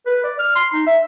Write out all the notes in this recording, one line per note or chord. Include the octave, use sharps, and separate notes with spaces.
B4
D5
F6
C6
D#4
E5